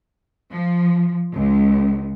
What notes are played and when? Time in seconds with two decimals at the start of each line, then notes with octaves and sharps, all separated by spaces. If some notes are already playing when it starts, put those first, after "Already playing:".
0.51 F3
1.33 C#2